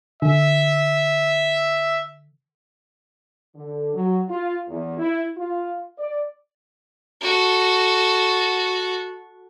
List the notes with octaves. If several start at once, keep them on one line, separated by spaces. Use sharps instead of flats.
D3 E5
D3
F#3
F4
E2
E4
F4
D5
F#4 A4